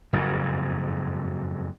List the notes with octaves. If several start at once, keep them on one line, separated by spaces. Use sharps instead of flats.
F#1 F2 G#2